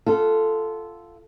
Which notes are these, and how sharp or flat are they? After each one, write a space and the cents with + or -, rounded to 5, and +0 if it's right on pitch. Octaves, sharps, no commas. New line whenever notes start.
F4 -15 A4 +0 F#5 +0